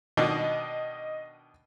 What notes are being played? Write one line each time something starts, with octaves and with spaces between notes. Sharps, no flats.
B2 D#3 D4 D#5